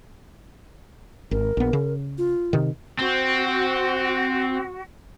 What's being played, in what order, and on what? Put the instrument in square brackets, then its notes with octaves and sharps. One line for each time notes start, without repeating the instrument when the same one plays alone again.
[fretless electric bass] G#1 [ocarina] A#4
[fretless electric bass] A#1 B3
C#3
[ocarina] F4
[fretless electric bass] C3 D#3
[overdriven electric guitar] C4 [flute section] F#4